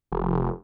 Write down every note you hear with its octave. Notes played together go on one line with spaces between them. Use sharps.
F1